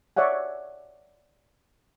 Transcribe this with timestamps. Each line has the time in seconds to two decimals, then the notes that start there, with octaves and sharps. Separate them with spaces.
0.17 C#5 D5 E5 F#5 G#5